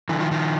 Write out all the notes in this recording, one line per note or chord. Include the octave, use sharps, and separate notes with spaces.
D3 E3
D#3 F3
D#3 F3